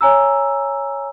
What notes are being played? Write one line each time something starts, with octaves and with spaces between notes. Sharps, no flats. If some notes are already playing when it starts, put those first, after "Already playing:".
C#5 G#5 A#5 E6